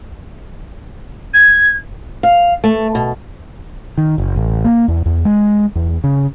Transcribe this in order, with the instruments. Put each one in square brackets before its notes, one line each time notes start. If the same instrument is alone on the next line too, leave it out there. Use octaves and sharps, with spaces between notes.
[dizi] G#6
[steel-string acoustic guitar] F5
A3
B2
[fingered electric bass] D#3
F#1
A1
A#3
E2
E2
G#3
E2
C#3